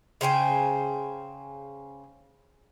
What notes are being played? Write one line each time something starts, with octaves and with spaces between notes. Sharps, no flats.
C#3 C5 G5 G#5